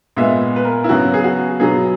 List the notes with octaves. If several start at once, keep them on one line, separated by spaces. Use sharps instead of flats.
A#2 G#3 B3 E5
B4
A#4
E4
C#3 F#3 B3 F#4
G#4
F#4
B2 F#3 B3 G#4